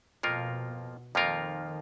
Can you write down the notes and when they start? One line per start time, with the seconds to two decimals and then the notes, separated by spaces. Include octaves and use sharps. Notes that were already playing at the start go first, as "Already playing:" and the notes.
0.23 F2 B2 F3 A#3 F4 A#4
1.14 F2 D#3 F3 A#3 F4 A#4